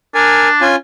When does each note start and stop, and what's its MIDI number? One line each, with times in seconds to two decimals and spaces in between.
0.15 0.64 62
0.15 0.48 70
0.15 0.48 80
0.61 0.76 61
0.61 0.76 65
0.61 0.76 80